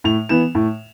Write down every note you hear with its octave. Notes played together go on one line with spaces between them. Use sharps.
A2 F7
E3 B3 E7
A2